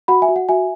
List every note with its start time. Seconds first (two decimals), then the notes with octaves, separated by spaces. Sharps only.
0.08 F#4 F#5 B5
0.22 E5 G#5
0.28 F#4
0.36 F#5
0.49 F#4 E5 G#5